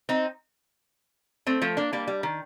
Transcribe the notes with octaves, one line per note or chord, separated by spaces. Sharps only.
C4 D#4
A3 C4
F3 A3
A#3 D4
G3 A#3
G3
D#3